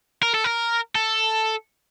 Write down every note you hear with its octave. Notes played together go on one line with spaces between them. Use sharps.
A#4
A4
A#4
A4